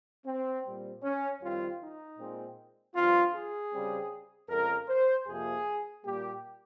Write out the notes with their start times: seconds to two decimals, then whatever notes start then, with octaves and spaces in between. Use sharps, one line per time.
0.26 C4
0.64 A#2 G3 C4
1.03 C#4
1.41 F2 D#3 G3 C4 F4
1.81 D#4
2.18 A#2 G#3 C4
2.95 G2 F3 C4 F4
3.34 G#4
3.74 C#3 G3 C4
4.50 F2 C#3 G#3 A#4
4.89 C5
5.27 F2 C3 F3 A#3 G#4
6.04 A#2 G3 A#3 G4